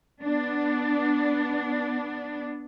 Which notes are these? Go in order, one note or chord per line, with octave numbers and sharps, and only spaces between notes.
B3 D4